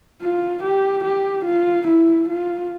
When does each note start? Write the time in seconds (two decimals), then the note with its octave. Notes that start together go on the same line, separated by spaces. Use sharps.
0.22 F4
0.63 G4
1.05 G4
1.45 F4
1.87 E4
2.29 F4